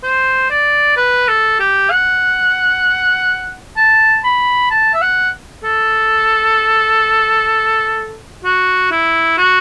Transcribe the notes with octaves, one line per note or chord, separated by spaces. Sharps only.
C5
D5
B4
A4
G4
F#5
A5
B5
A5
E5
F#5
A4
F#4
E4
F#4